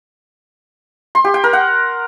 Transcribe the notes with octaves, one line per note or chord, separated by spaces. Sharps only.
C6
G4
G5
A#4
F#5